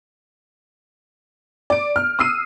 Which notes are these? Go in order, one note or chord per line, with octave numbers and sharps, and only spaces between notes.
D5 D7
F6
D#6 E6 C7 D#7